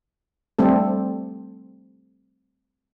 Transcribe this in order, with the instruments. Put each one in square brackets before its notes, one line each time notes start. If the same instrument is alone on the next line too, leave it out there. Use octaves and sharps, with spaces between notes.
[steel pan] G3 A3 C4 A4